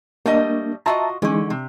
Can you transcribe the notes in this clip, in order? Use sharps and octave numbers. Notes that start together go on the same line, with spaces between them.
G3 A3 A#3 D4 D#5
F4 F#4 D#5 E5 A5 A#5
D3 E3 G#3 C#4 D#4
C3